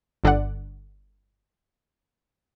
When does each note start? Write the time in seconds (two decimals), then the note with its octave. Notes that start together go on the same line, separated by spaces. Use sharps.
0.24 G1 D3 D5 F#5